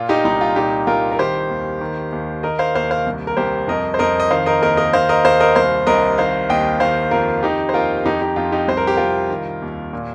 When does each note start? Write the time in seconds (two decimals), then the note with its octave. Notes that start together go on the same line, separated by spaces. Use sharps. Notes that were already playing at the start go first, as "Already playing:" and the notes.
Already playing: A#2 F4
0.09 D#4 G4
0.25 C2 D#4
0.41 F4
0.56 A#2 D#4 G4
0.87 C2 F4 A#4
1.12 A#4
1.19 D#3 G4 C5
1.49 D#2
1.81 D#3
2.12 D#2
2.43 D#3 A#4 D#5
2.59 C5 F5
2.75 D#2 C5 F5
2.91 C5 F5
3.06 C2
3.27 A#4
3.37 C2 G4 C5
3.68 F2 A#4 D#5
3.94 C5
3.99 F2 A#4 D#5
4.20 D#5
4.30 D#3 C5 F5
4.46 A#4 D#5
4.62 D#2 A#4 D#5
4.77 A#4 D#5
4.93 D#3 C5 F5
5.09 A#4 D#5
5.24 D#2 C5 F5
5.40 A#4 D#5
5.55 C2 C5 F5
5.87 C2 A#4 D#5
6.18 D#3 C5 F5
6.50 D#2 D#5 G5
6.80 D#3 C5 F5
7.11 F2 F4 A#4
7.43 D#3 D#4 G4
7.69 C5
7.74 D#2 F4 A#4
8.05 F2 D#4 G4
8.21 D#4 G4
8.36 F2 F4
8.52 D#4 G4
8.68 C2 C5
8.77 A#4
8.87 G4
8.97 C2 F4 A#4
9.30 D#3
9.62 D#2
9.93 A#2